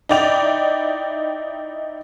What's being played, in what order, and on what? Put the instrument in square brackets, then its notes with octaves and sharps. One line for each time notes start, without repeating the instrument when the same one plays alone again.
[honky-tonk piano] D#4 E4 D5 G5 F7